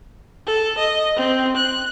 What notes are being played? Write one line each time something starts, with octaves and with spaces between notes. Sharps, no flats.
A4
D#5
C4
F#6